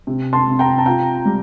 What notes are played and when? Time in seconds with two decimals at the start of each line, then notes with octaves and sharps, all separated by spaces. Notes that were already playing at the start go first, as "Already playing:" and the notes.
0.07 C3
0.33 A5 C6
0.47 C3
0.59 G5 A#5
0.78 A5
0.86 F4 G5 A#5
1.25 G3